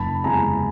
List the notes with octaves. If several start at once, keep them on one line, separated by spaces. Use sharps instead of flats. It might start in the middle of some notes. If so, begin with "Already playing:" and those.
Already playing: F#1 A5 B5
E2 C3 E3 G#3 G#5 A#5